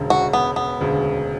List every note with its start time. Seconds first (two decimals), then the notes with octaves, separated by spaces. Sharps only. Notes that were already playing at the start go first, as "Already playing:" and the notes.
Already playing: E1 D2 C#3 G#3
0.10 F#4
0.33 B3
0.56 B3
0.80 E1 D2 C#3 G#3